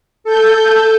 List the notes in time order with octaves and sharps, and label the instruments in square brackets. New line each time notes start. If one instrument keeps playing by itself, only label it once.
[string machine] A4 G6